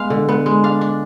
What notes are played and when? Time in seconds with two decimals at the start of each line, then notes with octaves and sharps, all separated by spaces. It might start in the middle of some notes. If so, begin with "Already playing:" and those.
Already playing: G#3 B3 F5
0.10 D3
0.29 B3
0.46 G#3
0.64 D4 F5
0.81 D4